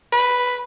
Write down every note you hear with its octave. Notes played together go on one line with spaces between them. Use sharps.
B4